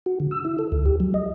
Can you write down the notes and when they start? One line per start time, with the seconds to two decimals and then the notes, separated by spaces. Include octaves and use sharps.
0.06 F#4
0.20 D3
0.31 E6
0.45 E4
0.59 A4
0.72 D2
0.86 G4
1.00 F#3
1.14 D#5